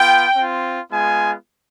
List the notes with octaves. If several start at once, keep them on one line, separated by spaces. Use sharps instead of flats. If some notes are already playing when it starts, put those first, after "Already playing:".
Already playing: B3 F4 G5
C4 F4
G#3 B3 F4 G#5